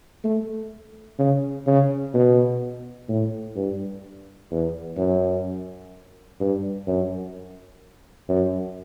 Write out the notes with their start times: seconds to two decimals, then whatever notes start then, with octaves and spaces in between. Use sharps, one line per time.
0.24 A3
1.19 C#3
1.67 C#3
2.14 B2
3.09 A2
3.56 G2
4.51 E2
4.97 F#2
6.40 G2
6.87 F#2
8.29 F#2